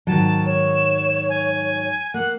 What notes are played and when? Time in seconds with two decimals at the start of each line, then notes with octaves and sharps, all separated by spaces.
0.07 G#2 D#3 F#3 A5
0.46 C#5 E7
1.29 G#5
2.14 A#3 F#5 F#6